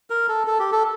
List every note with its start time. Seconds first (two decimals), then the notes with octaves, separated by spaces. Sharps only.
0.10 A#4
0.29 A4
0.47 A4
0.59 G4
0.72 A4